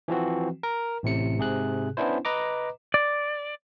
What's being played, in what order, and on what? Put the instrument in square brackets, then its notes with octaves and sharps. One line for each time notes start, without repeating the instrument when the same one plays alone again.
[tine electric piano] E3 F3 C4 F#4
A#4
A1 A2 C3 C#7
G#2 C3 G#4 F#6
B3 C#4 D4 E4 C5
B4 D#5 A#5 D6
[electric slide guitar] D5